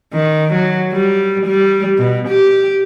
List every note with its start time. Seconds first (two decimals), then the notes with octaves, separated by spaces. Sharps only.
0.14 D#3
0.53 F#3
0.93 G3
1.46 G3
1.98 B2
2.28 G4